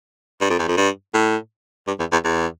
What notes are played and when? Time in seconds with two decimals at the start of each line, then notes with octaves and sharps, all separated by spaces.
0.41 G2
0.50 F2
0.59 E2
0.68 F2
0.77 G2
1.14 A2
1.88 G2
2.00 E2
2.12 E2
2.25 E2